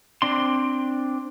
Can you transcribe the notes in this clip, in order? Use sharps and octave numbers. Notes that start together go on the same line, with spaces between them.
C4 D4 C6